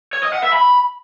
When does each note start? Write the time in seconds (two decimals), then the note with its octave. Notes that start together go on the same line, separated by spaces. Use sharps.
0.13 C#5
0.23 D#5
0.33 F#5
0.43 E5
0.53 B5